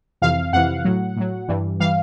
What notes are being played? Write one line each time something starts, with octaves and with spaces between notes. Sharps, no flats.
F2 C3 E3 F5
F2 C3 E3 F#5
A2 F#3
A2 F#3
G2 E3 G3
E3 G3 F5